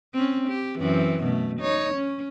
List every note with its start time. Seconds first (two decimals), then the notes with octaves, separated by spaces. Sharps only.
0.14 C4 C#4
0.48 G4
0.79 F#2 E3 C4
1.24 B2 A3
1.60 D#4 C#5
1.95 C#4